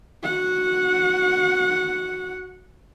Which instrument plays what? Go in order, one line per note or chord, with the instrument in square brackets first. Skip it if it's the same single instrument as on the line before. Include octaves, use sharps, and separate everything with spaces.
[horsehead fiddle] F#4 F#5